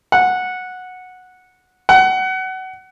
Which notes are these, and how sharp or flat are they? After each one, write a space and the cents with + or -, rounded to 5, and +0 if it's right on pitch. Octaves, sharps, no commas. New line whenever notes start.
F#5 -10
F#5 +25